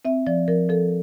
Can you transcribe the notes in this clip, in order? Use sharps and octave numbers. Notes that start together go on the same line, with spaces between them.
C4 E5
F3 D5
F3 A#4
F3 A4